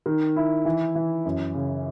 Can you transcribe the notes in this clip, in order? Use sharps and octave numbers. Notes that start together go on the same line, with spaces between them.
D#3
E4
E3
E3
F#2
C#3